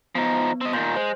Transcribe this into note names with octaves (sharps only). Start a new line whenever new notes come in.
F3 B3 D#4
C4 D#5
A#2 D#3 C6 G6
G#3 C5